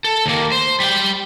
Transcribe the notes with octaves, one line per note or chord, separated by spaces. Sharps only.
A4
D#2 A#3
C5
G3 G5